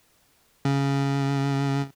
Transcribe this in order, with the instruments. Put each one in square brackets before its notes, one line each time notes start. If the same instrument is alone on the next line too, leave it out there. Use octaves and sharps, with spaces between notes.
[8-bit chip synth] C#3